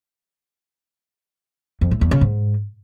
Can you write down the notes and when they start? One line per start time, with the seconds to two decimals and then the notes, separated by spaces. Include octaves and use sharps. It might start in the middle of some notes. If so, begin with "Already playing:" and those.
1.81 F2
1.91 A2
2.01 E2
2.11 C#3
2.21 G#2